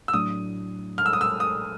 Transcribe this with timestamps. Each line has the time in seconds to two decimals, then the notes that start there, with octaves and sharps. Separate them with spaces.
0.08 E6
0.14 A2 F#3 A3 D4 D#6
0.98 F6
1.06 E6
1.13 D#6
1.21 E6
1.40 D#6